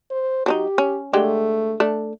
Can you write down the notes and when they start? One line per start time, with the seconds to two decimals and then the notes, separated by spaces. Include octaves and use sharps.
0.11 C5
0.46 F#3 D4 D#4 G4
0.78 C#4
1.13 D3 G#3 A3 G4
1.80 A3 D4